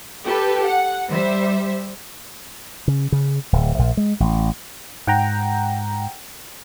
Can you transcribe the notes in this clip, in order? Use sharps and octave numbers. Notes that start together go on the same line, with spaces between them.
G4 A4 B4
F#5
G3 C5 E5
C#3
C#3
D1
A#1
G#3
A1
G#2 F#5 G5 A#5